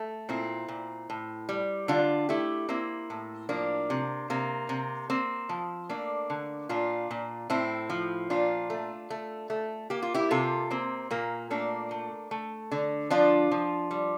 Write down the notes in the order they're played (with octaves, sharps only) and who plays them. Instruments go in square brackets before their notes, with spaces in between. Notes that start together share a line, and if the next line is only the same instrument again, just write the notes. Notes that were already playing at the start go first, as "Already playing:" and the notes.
Already playing: [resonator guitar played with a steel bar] A3
A#2 C4 E4
A#2
A2
G3
D3 D4 F4
A3 E4 G4
A#3 C4 E4
A2
F3 A#3 D4
C3
C3 A#3
C3
A#3 C4
F3
A3 A#3 D4
D3
A#2 D4 F4
A#2
A2 C4 E4
F3
A#2 D4 F4
A3
A3
A3
A#3 G4
F4
E4 G4
C3 F4 A4
A#3 C4
A#2 A#3
A3 A#3 D4
A3
A3
D3
F3 D4 F4
F3
G3